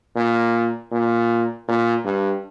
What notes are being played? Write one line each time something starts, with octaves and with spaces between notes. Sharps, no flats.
A#2
A#2
A#2
G2